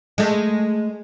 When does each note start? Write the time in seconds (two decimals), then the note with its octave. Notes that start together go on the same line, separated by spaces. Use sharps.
0.18 G#3 A3